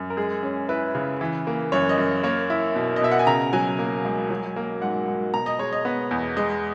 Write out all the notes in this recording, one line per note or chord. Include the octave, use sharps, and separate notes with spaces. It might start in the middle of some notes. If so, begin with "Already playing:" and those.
Already playing: F#2
A#4
G#3 G#4
C#4
E4 B4
C#3
E3
A#3
F#2 C#5
D#5
F#2
A#3 C#5
E4
B2
D#5
B2 E5
F#5
G#5
C#3 A#5
F#3 G#5
A#3
C#2
F#3
A#3
G#2 F#5
G#2
B2 A#5
D#5
G#3 C#5
D#5
B3
E2
G#3 D#5